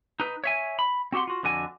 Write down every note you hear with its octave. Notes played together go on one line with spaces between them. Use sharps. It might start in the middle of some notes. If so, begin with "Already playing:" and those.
D#4 B4
C#5 E5 G#5
B5
C4 F#4 G4 F#5 C6
F4 F#4
F2 D3 F#4 G#5